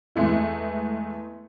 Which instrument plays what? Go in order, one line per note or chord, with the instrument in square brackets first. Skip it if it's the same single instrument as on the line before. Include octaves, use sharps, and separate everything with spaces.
[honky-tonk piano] E2 G#3 A3 E4